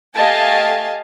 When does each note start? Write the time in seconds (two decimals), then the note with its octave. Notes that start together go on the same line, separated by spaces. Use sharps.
0.14 A3 G4 D#5 F5 G#5 A5